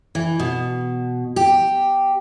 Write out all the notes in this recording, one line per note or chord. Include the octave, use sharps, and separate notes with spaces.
E3
B2
G4